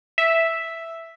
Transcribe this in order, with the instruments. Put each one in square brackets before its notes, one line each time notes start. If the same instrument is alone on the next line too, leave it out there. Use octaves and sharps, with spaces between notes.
[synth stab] E5